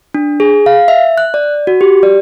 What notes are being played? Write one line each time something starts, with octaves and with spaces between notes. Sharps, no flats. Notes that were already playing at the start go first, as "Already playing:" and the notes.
D4
G#4
F5
E5
F#6
D5
F#4
G4
D5